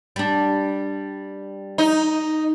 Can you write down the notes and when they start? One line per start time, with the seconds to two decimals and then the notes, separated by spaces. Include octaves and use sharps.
0.16 G3 D4
1.78 D#4